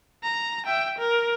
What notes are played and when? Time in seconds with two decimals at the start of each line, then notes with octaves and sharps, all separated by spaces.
0.23 A#5
0.66 E5 G5
0.98 A#4